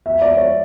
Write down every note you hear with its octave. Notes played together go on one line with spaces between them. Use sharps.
E5
D5
C#5